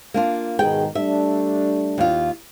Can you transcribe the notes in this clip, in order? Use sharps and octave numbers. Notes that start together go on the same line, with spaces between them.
A#3 D4 F4
G#2 B2 D#3 G#4 G5
G3 A3 D4 E5
D#2 F4